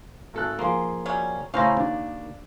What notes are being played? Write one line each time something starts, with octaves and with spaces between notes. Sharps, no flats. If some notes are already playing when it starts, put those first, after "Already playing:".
G#1 A4 F#6
F3 A#3 G#4 C6
F#3 G3 C#4
A2 C#3 C#4 C5 F5 A#5
D#2 D4